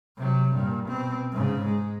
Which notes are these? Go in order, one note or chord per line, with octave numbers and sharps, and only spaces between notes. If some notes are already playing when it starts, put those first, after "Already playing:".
C3 F#3
G2 A#2
B2 C4
G#2 C#3
G#3